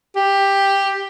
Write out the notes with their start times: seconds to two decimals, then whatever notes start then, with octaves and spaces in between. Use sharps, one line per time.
0.16 G4